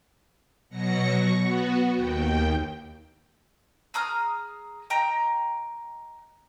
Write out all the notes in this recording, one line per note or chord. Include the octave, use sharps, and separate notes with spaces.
B2 F#3 A#6 C#7
C#6
B3 F#4
D#2 G5
G#4 A#5 D#6 F6
D#5 G5 A#5